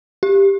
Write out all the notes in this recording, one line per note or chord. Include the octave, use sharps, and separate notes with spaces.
G4